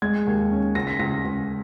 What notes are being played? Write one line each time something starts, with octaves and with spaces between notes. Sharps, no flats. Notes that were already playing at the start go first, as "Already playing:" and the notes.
G#3 G#6
D#2
C#4
C#2 A#6
B6
C#2 A#6
C#2